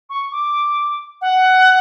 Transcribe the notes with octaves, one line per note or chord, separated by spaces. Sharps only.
C#6
D6
F#5